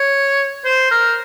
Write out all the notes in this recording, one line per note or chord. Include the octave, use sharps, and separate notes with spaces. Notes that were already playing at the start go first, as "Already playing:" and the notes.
Already playing: C#5
C5
A#4